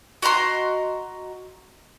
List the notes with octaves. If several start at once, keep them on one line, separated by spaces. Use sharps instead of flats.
F#4 D#5 A#5 C6